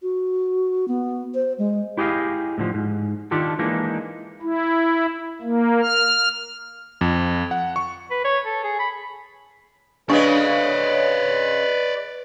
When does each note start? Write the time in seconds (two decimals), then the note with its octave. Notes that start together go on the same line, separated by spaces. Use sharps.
0.02 F#4
0.88 B3
1.34 C5
1.58 G#3
1.97 E4 G4 G#4 D#5 F5
2.58 A2 D3 F3
2.74 G#2
3.31 D#3 D4 F4 G4 A4
3.59 E3 G#3 A#3 D4 D#4
4.42 E4
5.42 A#3
5.82 F6
7.01 F2
7.51 F#5
7.76 C#6
8.11 B4
8.24 C#5
8.45 A4
8.64 G#4
8.79 B5
10.10 C#3 G#3 B3 D4 B4 D5 D#5 C#6